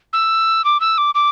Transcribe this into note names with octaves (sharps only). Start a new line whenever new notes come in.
E6
D6
E6
D6
D6